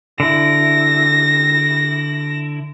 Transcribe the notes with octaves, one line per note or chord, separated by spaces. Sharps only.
D3 E4 A#6